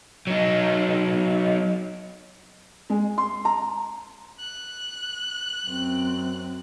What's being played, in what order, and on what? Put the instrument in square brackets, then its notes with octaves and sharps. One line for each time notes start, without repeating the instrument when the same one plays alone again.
[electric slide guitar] F#3 D#4
[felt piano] G#3
C6
A#5
[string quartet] F#6
[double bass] F#2 C4